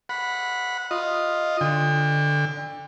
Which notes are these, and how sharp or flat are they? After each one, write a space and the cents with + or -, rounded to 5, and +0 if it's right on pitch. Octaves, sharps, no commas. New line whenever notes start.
F#5 -20 B5 +0
F4 +0 D#5 +0
D3 +0 G5 +40